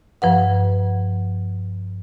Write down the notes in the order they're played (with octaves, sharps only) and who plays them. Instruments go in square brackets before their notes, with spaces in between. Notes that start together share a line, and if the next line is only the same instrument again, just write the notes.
[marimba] G2 F3 B4 F#5